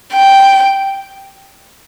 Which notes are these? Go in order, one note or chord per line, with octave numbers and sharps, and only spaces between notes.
G5